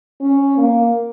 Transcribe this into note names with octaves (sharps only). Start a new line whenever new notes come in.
C#4
A#3